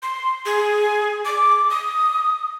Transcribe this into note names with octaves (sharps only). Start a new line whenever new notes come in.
C6
G#4
D6
D#6